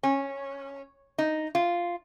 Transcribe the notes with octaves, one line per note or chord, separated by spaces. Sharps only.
C#4
D#4
F4